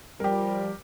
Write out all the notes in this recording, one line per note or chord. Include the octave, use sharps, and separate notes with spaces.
F3 G3 G4 A#4